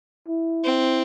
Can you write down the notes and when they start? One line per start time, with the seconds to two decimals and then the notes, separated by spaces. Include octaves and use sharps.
0.28 E4
0.64 C4